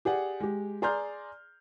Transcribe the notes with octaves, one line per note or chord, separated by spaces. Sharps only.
G4 G#4 D5 F#5
G#3 G4
G#4 D5 A#5 C6 F6 G6